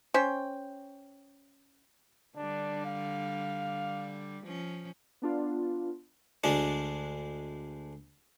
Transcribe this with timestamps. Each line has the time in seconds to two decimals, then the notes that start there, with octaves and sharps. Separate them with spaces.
0.14 C#4 C5 G5
2.37 D3 G3 D4
2.85 F5
4.44 F3 C#4
5.22 B3 D4 F4
6.44 D2 G#3 D4